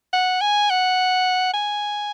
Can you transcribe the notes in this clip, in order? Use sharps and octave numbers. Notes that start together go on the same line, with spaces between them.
F#5
G#5
F#5
G#5